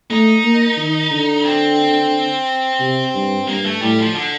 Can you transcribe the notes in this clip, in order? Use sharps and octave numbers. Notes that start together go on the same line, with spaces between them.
A3 D#4
A#3
D#3
D3
C4
C3
G2
G2 A#3
A3
A2 G3
F3
D3